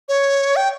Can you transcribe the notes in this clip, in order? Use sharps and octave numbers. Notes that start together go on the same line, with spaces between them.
C#5
G5